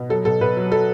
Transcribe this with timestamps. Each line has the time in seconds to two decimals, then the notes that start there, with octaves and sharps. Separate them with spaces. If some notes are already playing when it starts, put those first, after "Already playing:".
Already playing: B2
0.09 F#3 A4
0.25 B2 A4
0.41 B2 B4
0.57 F#3
0.71 F#3 A4